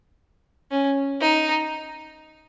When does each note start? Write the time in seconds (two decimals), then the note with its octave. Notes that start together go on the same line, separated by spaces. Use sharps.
0.71 C#4
1.21 D#4